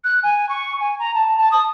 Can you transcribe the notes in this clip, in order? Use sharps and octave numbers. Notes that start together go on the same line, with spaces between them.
F#6
G#5
C#6
G#5
A#5
A5
A5
D#6